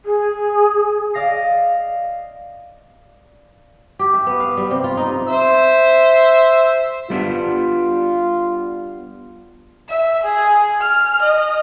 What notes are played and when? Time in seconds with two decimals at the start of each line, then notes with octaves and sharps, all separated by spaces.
0.05 G#4
1.14 D5 D#5 F5 A#6 C7
3.99 G4
4.14 E5
4.27 B3
4.40 F5
4.57 G3
4.71 C3
4.84 F4
4.97 D#4
5.28 C5 E5
7.10 G3 B3 D4 F4
9.89 E5
10.23 G#4
10.81 F6
11.22 D#5